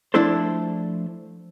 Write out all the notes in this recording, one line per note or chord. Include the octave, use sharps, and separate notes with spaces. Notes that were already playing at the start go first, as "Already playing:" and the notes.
F3 A3 D4 E4 A4 C5